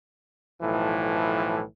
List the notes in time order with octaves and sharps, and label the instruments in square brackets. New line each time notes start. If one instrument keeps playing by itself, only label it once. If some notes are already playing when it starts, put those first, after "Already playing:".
[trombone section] B1 A2 E3 F3